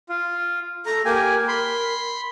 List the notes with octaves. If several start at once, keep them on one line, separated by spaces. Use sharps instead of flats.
F4
A4 A#5
A#3 G4 A#4 G#5
B5 C6